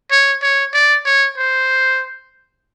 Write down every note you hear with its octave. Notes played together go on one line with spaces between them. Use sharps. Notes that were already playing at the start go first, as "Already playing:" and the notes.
C#5
C#5
D5
C#5
C5